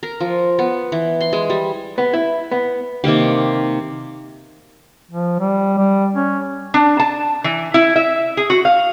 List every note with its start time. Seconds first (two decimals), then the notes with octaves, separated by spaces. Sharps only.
0.03 A#4
0.20 F3
0.59 B3
0.92 E3
1.21 C6
1.33 G#3
1.50 G3
1.98 B3
2.13 E4
2.51 B3
3.04 C3 D#3 A#3 G4
5.11 F3
5.40 G3
5.78 G3
6.16 C#4
6.74 D4
7.00 A5
7.44 E3
7.74 E4
7.96 E5
8.37 G#4
8.50 F#4
8.65 F5